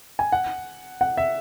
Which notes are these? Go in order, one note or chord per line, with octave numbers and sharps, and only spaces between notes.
G#5
F#5
F#5
E5